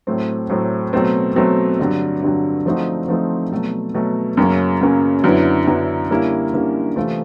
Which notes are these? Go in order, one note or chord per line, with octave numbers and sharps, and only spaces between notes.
A2 F#3 A3 C4
A2 F#3 A3 C4
B2 F#3 A3 C4
B2 F#3 A3 C4
G2 D3 F#3
G2 D3 F#3
F3 A3 C4 D#4 F#4
F3 A3 C4 D#4 F#4
B2 F#3 A3
B2 F#3 A3
F#2 C#3 F#3 A#3 C#4
F#2 C#3 F#3 A#3 C#4
F#2 D3 F#3 B3 E4
F#2 D3 F#3 B3 E4
D3 G3 A#3 C#4 E4
D3 G3 A#3 C#4 E4
C3 E3 A3 C4 F4